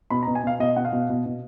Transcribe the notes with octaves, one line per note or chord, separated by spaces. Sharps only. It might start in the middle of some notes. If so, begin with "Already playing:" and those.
B2 B5
A#5
B2
G#5
B2 F5
B2 D#5
B2 F#5
F5
B2
B2
B2